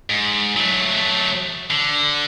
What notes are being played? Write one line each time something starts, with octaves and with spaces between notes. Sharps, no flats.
G#2
F#3 A3
D3